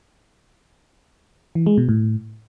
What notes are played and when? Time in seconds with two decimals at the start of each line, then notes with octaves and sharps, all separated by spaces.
1.55 E3
1.66 G#3
1.78 B2
1.89 A2